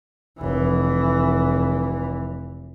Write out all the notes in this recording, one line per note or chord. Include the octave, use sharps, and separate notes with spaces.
F1 E3